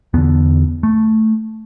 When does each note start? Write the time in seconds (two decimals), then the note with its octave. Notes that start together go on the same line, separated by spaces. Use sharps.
0.14 E2 D3 B3
0.83 A3